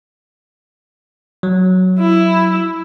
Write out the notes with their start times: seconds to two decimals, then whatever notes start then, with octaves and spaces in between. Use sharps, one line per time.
1.43 F#3
2.00 E4